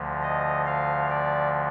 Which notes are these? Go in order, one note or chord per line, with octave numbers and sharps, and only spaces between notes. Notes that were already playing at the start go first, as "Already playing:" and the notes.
Already playing: D2 D3 F3
D#5
F5
D5